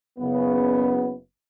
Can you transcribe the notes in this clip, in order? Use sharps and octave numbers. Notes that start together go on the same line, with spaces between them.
F#1 C#3 B3